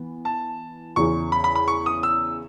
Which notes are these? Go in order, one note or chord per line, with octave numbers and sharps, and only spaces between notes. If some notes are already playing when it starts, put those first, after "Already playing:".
Already playing: E3 B3
A5
E2 C#3 E3 C#6
B5
B5
B5
C#6
D#6
E6